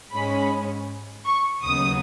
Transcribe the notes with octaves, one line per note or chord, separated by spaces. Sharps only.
G#2 G#3 C#4 B5
C#6
D#2 C#3 F#3 B3 D#4 D#6